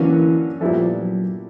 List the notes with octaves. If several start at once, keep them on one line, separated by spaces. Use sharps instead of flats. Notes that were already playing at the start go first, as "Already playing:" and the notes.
Already playing: D3 E3 F#3 A#3 C#4
A#2 F3 G3 B3 E4 A4
F#3